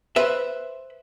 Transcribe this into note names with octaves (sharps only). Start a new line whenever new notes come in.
B4 C5 E5